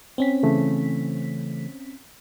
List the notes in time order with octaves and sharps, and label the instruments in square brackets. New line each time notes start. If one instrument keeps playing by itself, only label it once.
[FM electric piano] C4 C#4 B6
[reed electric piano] C#3 E3 A3